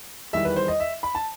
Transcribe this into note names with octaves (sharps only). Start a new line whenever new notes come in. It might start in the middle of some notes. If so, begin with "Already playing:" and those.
E2 D#3 G3 E5
B4
C5
D#5
E5
B5
A5